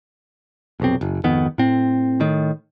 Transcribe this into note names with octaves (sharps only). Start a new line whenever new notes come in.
F1 B1 C4
F#1
G#1 F2 D#3 B3
A2 C4
A2 D#3